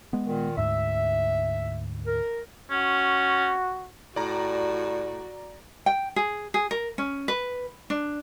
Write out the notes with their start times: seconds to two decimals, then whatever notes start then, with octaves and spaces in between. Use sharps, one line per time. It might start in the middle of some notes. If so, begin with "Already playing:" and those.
0.13 G#3 B3
0.26 A#2 D#3
0.57 D2 G#2 E5
2.07 A#4
2.71 C#4 F#4
4.16 A2 G3 F#4 D5 A#5
5.86 G5
6.16 G#4
6.54 G#4
6.71 A#4
6.98 C#4
7.28 B4
7.90 D4